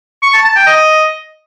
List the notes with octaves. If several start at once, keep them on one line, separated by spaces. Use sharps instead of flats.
C#6
A5
A5
G5
D#5